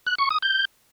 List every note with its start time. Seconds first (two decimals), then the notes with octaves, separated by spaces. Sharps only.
0.07 F#6
0.19 C#6
0.30 D#6
0.42 G6